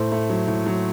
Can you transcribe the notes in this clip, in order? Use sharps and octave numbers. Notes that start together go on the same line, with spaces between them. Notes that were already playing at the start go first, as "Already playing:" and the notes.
Already playing: A2 A3 C5
A3
F#3
A2
F#3